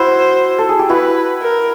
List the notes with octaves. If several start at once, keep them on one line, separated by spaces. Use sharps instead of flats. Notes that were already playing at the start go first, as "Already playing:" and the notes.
Already playing: E4 F#4 C5
A4
G#4
G4
E4 F#4 B4
A#4